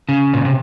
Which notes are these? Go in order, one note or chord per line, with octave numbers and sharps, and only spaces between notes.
C#3
A#2
C3